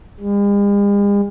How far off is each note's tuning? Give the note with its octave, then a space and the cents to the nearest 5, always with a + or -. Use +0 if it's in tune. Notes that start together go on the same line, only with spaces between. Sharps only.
G#3 -45